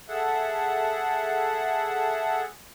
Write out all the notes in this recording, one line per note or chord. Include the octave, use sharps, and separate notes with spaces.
G#4 A4 E5 F#5